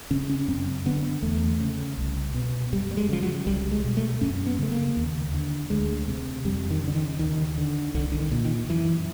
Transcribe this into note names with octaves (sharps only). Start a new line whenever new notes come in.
C#3 C#4
C#4
F#2 C4
D3 B3
E2 A3
C#3
C2
B2
F#2 G3
G3
G#3
C#3 F3
F#3
C2 G3
G#3
B2
A3
F#2 C#4
B3
C#3 A3
A#3
D#2
D3
D2 G#3
C3
F2 G3
D#3
C#3
D3
D#3
D#2 D#3
D3
C2 D3
D3
D#3
A#2
D#3
F#2 E3